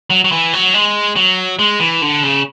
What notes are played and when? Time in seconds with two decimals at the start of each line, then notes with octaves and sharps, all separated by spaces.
0.10 F#3
0.25 F#3
0.32 E3
0.53 F#3
0.74 G#3
1.16 F#3
1.59 G#3
1.80 E3
2.02 D3
2.23 C#3